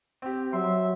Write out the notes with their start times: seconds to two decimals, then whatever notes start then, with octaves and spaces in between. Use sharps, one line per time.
0.22 C4 G4
0.53 F#3 E5 C6